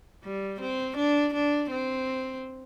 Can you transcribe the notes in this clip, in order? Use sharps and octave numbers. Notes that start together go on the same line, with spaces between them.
G3
C4
D4
D4
C4